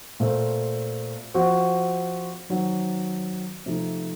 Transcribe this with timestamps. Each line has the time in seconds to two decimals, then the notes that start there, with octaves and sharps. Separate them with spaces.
0.20 A#2 A3 C4
1.34 F3 C4 F#4
2.49 D#3 F#3 C4
3.66 C3 F3 A3 D#4